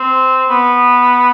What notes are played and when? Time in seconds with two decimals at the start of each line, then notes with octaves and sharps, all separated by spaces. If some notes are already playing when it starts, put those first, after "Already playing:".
Already playing: C4
0.49 B3